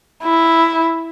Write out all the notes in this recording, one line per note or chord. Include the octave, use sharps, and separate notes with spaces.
E4